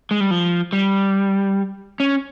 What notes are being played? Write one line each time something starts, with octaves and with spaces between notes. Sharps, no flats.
G#3
G3
F3
G3
C#4